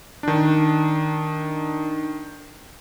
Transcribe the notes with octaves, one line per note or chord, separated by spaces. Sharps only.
D#3 D4